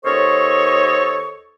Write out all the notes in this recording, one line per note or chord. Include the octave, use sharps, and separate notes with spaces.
D#2 A4 C5 C#5 D#5 C#6